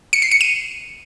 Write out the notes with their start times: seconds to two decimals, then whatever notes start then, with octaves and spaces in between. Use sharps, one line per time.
0.13 C#7
0.22 C7
0.31 C#7
0.41 D#7